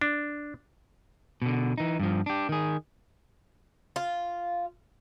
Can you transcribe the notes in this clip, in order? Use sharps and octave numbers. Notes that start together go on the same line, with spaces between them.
D4
B2 D3
E3 D#4
G2 F3
D4 G4
D#3 G#4
F4